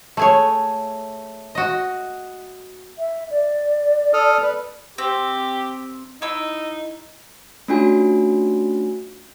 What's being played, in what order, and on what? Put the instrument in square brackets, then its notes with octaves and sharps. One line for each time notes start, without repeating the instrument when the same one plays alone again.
[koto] A3 G#4 C#5
F#4 D#5
[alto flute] E5
D5
[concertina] A4 D#6 F6
B4
[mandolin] C4 [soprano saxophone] G4
[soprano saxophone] D#4 [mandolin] E4 E6
[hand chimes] A3 C#4 D4 F4 F#4 G#5